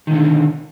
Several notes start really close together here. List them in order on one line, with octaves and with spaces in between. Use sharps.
D#3 B2 D3